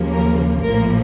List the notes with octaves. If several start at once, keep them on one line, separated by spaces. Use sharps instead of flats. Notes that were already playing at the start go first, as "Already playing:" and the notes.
Already playing: D#2 C#3 F3 A#3
A#4
A#1 A2 F3 A#3 A#4